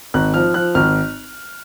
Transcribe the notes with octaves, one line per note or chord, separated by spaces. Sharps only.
G#1 F#6
F3 F6
F3 F#6
G#1 F6